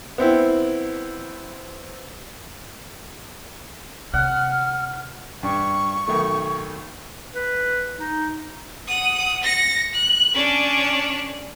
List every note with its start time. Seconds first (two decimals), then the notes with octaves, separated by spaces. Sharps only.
0.18 B3 C4 E4
4.14 C3 F#5 F6
5.43 G2 C#6
6.08 B1 D#3 A3
7.35 B4
7.99 D#4
8.87 F#5 D#6
9.43 A#6 C#7
9.93 F#6
10.34 C#4 D4